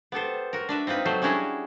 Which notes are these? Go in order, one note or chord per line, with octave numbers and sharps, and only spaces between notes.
B3 G4 A4 C5
F#4 A#4
D4 B4 E5
C4 D#4 F4 B4
F#3 A3 C5
G3 C#4 D4 E4 F#4 G#4